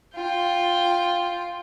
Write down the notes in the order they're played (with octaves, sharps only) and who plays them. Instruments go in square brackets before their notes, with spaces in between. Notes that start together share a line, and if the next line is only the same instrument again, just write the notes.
[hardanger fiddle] F4 G5